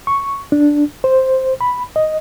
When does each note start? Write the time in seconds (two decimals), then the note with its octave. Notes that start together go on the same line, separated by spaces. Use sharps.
0.07 C#6
0.52 D4
1.04 C5
1.61 B5
1.96 D#5